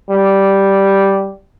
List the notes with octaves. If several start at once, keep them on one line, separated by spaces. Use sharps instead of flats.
G3